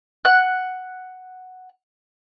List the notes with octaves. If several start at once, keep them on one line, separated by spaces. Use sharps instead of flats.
F#5 F#6